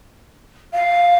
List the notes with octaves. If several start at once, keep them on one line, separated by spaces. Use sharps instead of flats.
F5